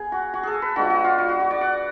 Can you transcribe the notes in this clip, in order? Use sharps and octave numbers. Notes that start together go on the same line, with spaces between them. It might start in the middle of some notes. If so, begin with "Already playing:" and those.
Already playing: B3 G#4
F#4
F#4
G#4 A4
B4
D3 G#3 B3 F4 F#4
F#4
F4
F#4
F#4
F#4
D5
F#5